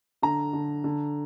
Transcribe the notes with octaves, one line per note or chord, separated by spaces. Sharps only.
D3 A#5
D3
D3